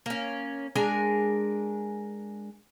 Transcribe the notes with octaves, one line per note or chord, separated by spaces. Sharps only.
A#3 C#4
G#3 D4 A#4 G#5